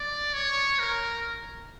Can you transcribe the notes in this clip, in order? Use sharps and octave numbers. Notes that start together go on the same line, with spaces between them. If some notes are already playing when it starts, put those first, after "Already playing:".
Already playing: D5
C#5
A#4